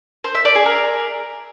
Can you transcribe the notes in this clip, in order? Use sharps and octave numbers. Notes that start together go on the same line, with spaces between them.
C5
E5
D5
G#4
A#4